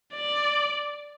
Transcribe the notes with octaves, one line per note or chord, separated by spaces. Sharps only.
D5